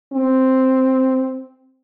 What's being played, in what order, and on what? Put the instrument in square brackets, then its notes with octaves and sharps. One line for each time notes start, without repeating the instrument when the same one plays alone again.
[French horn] C4